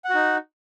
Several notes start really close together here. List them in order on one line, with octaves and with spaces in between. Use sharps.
F#5 F#4 D#4